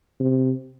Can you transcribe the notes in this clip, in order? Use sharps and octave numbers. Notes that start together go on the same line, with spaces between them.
C3